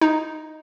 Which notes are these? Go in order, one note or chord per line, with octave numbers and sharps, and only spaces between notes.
D#4